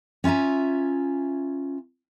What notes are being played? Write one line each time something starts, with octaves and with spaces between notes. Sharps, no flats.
C#4 F4 E5 G#5 A#5